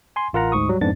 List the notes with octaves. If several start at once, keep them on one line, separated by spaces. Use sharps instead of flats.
G#5 C6
A1 F4 A#4 F#5 A#5
D2 G#2 C#6 D#6
F#3 G3
F2 G#2 B3 D4 A6